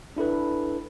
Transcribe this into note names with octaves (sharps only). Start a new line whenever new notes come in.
D4 E4 A4 B4